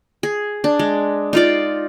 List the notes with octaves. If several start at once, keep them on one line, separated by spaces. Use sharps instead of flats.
G#4
D4
G#3
D#4 F4 D5